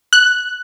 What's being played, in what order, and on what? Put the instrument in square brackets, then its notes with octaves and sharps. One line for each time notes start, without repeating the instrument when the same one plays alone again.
[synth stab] F#6